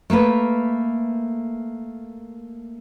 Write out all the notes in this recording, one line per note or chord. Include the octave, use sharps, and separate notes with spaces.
A3 A#3 A#4 B4